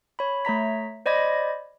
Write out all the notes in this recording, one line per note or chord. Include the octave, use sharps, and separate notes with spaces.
C#5 B5
A3 C#5 A#5 B6
C5 D5 D#5 B5 G#6 A#6